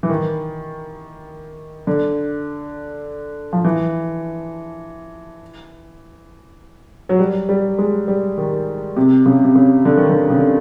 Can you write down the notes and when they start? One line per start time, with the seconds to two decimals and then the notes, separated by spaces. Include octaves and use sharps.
0.03 E3
0.09 D#3
1.87 D3
3.53 F3
3.65 E3
7.09 F#3
7.19 G3
7.49 G3
7.78 G#3
8.08 G3
8.38 D#3
8.96 C3
9.26 C#3
9.44 C3
9.55 C#3
9.85 D3
9.97 D#3
10.09 D3
10.30 C#3
10.38 D3